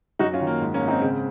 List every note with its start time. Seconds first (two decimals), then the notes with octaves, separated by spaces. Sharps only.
0.19 F#2 D#4 F#4
0.34 C#4 F4
0.41 D#3
0.47 A#3
0.61 G#2
0.74 A#3 C#4
0.81 G#2
0.88 C4 D#4
1.01 C#3 C4